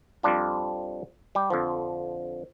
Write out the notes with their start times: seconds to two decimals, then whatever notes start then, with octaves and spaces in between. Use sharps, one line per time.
0.23 F2 F3 G3 D4 F4
1.35 G3 G4
1.50 F2 D3 F3